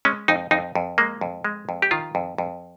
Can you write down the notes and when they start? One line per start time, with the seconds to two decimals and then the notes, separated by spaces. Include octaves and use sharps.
0.05 G#3 C#4
0.28 F2 D#4
0.51 F2 D#4
0.75 F2
0.98 G#3 A#3
1.21 F2
1.44 G#3
1.69 F2
1.82 G4
1.91 D#3 F4
2.15 F2
2.38 F2